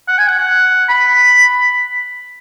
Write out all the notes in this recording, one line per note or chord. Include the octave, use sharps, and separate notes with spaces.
F#5
G#5
F#5
F#5
B5